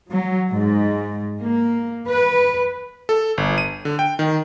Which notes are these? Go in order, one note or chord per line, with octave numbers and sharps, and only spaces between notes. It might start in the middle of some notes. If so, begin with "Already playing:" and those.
F#3
G#2
A#3
B4
A4
G1
D#7
D3
G5
D#3